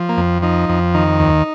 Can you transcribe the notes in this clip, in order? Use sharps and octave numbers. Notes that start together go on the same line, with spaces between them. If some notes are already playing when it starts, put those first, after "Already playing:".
Already playing: F3
A#3
F2
F3 D#4
F2
D#3 D#4
D#2